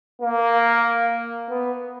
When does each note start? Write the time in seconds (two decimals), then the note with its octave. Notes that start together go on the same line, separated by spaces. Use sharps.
0.21 A#3
1.50 B3